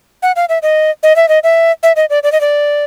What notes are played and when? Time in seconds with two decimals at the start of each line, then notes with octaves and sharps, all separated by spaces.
0.23 F#5
0.36 F5
0.49 E5
0.62 D#5
1.03 D#5
1.16 E5
1.29 D#5
1.43 E5
1.83 E5
1.96 D#5
2.10 D5
2.23 D5
2.32 D#5
2.41 D5